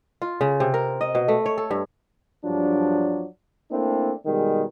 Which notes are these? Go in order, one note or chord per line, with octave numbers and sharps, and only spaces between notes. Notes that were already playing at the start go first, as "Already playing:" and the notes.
F4
C#3
C3
A#4
D#5
B2
A3
C#5
A4
G2
G2 F3 F#3 D4
A3 A#3 C4 D4 E4
B2 D#3 G3 G#3